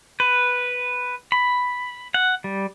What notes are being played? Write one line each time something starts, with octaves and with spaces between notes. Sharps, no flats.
B4
B5
F#5
G3